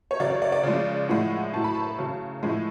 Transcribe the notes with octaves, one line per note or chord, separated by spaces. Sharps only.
C#5
C#3 F#3 D5
C#5
D5
D5
C#3 F3 G#3
A2 F3 G#3 F#5
A2 F#3 A5
B5
A5
C#3 F#3
A2 F3 G#3